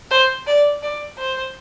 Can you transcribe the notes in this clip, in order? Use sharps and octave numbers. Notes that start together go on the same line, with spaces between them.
C5
D5
D5
C5